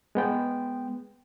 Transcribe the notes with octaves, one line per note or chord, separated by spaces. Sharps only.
G#3 B3 G5